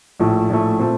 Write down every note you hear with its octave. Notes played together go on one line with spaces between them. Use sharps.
A#1 A2 A3
A#1 A2 A3
A#2 A3 C4